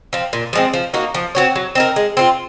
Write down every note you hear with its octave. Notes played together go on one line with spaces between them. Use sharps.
F3 C4
A#2
F3 G#3 C4
F3
A#3 D#4 F#4
F3
C4 F#4 C#5
F#3
C4 D#4 A#4
G#3
C4 F4